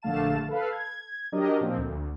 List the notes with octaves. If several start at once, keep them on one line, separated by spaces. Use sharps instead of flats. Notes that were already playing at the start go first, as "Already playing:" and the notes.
A#1 D3 A3 F5 A5 E7
A4 B4 F5
G#6
F#3 D4 G4 A#4 D#5
A#2 F3 C4
D2